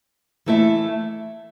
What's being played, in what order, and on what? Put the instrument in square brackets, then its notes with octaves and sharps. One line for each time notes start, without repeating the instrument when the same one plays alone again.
[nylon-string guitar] E3 A3 E4 A4 E5